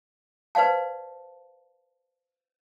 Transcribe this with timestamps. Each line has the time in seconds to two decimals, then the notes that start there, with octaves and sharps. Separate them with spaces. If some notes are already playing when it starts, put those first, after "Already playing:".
0.55 B4 C5 D5 F5 A5